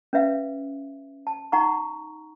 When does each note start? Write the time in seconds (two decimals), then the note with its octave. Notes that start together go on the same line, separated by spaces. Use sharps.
0.13 C#4 B4 E5 F5
1.27 A5
1.52 D#4 F#5 A#5 C#6